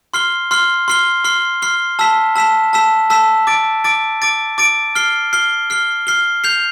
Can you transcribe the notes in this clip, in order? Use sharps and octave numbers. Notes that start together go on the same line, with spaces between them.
C6 F6 C7 G7
C6 F6 C7 G7
C6 F6 C7 G7
C6 F6 C7 G7
C6 F6 C7 G7
A5 E6 B6 E7
A5 E6 B6 E7
A5 E6 B6 E7
A5 E6 B6 E7
D6 A6 D7
D6 A6 D7
D6 A6 D7
D6 A6 D7
F6 C7 G7
F6 C7 G7
F6 C7 G7
F6 C7 G7
G6 C7 F7